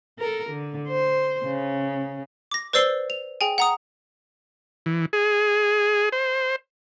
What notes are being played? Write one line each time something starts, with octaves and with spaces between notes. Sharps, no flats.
A4 A#4
D3
C5
C#3
D6 A#6
B4 C5 D5 E6 C7 G7
F7
G#4 G5 G#5
F#5 A#5 D#6
E3
G#4
C5